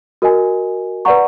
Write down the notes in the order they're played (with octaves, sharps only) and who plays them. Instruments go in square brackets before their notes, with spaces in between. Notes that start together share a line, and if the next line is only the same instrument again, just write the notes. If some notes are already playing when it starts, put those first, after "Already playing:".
[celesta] F#4 A#4 D#5 G#5
B4 D5 F#5 A#5 C#6